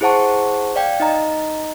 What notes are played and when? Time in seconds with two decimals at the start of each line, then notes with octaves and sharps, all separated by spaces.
0.01 E4 G#4 C5 F#5 A5 C#6
0.76 D5 F5 G5
1.00 D#4 D#5 A#5